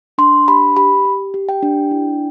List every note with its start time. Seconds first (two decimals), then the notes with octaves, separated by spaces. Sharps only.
0.18 D4 C6
0.48 G4 B5
0.77 G4 B5
1.05 G4
1.34 G4
1.49 G5
1.63 D4
1.91 E4